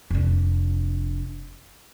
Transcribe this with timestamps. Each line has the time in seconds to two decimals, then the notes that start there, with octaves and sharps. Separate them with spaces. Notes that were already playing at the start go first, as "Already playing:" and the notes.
0.10 F1 D4